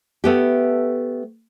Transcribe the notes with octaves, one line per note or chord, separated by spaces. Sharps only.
A3 B3 G4